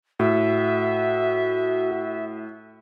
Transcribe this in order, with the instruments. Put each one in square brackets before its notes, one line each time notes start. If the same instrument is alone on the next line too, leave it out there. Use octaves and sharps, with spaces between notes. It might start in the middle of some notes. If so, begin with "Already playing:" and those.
[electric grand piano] A2 [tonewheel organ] F#4 [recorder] E5